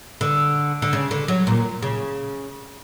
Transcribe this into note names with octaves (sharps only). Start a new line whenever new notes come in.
D3
D3
C#3
D3
F#3
A#2
C#3